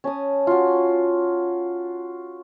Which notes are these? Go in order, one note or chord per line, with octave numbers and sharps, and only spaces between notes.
C#4 A5 D#6
F4 F#4